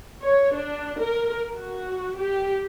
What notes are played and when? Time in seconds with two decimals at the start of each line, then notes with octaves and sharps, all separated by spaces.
0.23 C#5
0.54 D4
1.01 A#4
1.56 F#4
2.19 G4